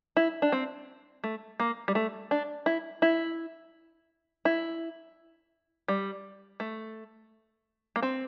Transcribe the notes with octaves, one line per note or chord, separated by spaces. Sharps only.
E4
D4
C4
A3
A#3
G3
A3
D4
E4
E4
E4
G3
A3
A#3
C4